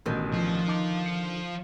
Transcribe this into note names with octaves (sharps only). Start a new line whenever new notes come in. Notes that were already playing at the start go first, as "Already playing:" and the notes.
A1 B2 D3 D#3 G6
F3
D#4 A5 D6
C#7